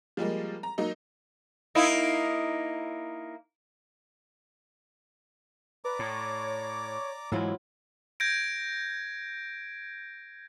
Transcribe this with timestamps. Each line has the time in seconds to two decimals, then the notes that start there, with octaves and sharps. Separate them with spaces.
0.17 F3 G3 G#3 A#3
0.63 A#5
0.78 F#3 A#3 D#4
1.75 A#3 D#4 E4
5.85 B4 D5 A#5 D6
5.99 A2 C#5
7.32 G#2 E3 F#3 G#3 E4 F4
8.20 G6 G#6 A#6 D7